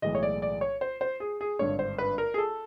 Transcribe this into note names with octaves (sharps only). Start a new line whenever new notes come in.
B1 A2 E3 G#3 D#5
C#5
D5
D5
C#5
C5
C5
G#4
G#4
G#1 G2 D3 C#5
C5
B4
A#4
G#4
A4